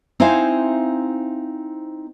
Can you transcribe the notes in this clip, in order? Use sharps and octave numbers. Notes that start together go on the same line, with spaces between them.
C4 D#4 E4 C5 F5 G#5